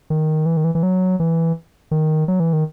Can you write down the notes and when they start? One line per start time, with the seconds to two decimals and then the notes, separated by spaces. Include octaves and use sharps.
0.10 D#3
0.46 E3
0.57 D#3
0.64 E3
0.75 E3
0.83 F#3
1.20 E3
1.91 D#3
2.28 F#3
2.40 E3
2.53 D#3